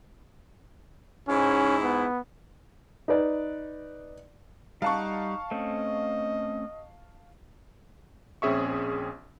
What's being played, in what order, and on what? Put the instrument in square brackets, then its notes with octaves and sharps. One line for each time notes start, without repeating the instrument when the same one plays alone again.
[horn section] G#2 E4 [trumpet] C#4
[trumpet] B3
[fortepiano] D#4 B4 D5
[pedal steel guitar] G3 F#5 [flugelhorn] D#4 [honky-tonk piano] F5 A5 C#6
[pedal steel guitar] A3 C4 C#4 [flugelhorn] D#5
[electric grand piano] A#1 C4 C#4 G#4 E5 C#6